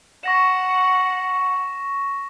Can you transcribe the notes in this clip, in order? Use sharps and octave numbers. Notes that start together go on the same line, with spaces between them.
F#5 C#6 A#6 E7